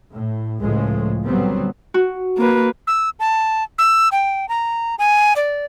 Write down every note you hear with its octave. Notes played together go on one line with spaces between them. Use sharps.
A2
C#2 A2 C#3 F3 G#3 A3
A#2 D3 F#3 G3 B3 C4
F#4
A#3 B4
E6
A5
E6
G5
A#5
G#5
D5